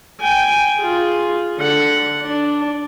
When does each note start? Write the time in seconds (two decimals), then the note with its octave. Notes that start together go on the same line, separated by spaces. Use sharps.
0.21 G5 G#5
0.78 F4 G#4
1.59 D3 F#5
2.22 D4